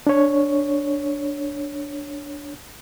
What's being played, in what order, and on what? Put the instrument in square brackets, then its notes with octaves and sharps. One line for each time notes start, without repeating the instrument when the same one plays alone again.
[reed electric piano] D4 C#5